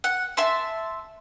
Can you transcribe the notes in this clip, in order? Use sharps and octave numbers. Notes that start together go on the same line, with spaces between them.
F#5
E5 A5 C6 E6